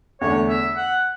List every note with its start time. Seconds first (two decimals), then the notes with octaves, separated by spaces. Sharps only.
0.21 E2 D3 A3 D4 C#5
0.49 E5
0.76 F#5